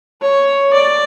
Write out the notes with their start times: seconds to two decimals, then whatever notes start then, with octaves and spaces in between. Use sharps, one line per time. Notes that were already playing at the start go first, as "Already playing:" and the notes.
0.21 C#5
0.74 D5